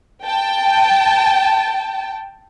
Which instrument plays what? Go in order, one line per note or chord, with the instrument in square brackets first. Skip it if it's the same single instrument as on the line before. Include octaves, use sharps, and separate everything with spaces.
[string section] G5 A5